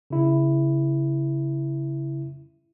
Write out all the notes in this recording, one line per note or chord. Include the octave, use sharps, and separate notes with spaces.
C#3 E4